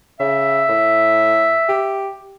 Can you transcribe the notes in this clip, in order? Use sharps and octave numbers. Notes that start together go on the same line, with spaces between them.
C#3 E5
A2
G4